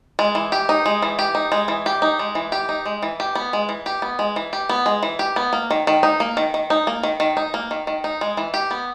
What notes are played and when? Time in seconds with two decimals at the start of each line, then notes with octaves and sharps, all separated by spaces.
0.19 G#3
0.35 E3
0.52 G4
0.69 D#4
0.86 G#3
1.02 E3
1.19 G4
1.35 D#4
1.52 G#3
1.68 E3
1.86 G4
2.02 D#4
2.19 G#3
2.35 E3
2.52 G4
2.69 D#4
2.85 G#3
3.03 E3
3.20 G4
3.35 B3
3.53 G#3
3.69 E3
3.86 G4
4.02 B3
4.19 G#3
4.36 E3
4.53 G4
4.69 B3
4.86 G#3
5.03 E3
5.19 G4
5.36 B3
5.53 A#3
5.71 D#3
5.87 D#3
6.03 D#4
6.20 A#3
6.37 D#3
6.54 D#3
6.70 D#4
6.87 A#3
7.03 D#3
7.20 D#3
7.37 D#4
7.54 A#3
7.71 D#3
7.87 D#3
8.04 D#4
8.21 G#3
8.37 E3
8.54 G4
8.71 B3